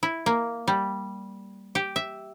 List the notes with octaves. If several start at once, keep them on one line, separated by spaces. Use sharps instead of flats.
E4
A#3
G3
G4
E5